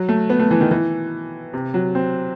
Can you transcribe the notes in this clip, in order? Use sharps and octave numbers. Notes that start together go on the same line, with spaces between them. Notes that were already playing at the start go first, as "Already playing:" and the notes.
Already playing: F#3
A3
B3
A3
E3
D#3
E3
C3
F#3
C4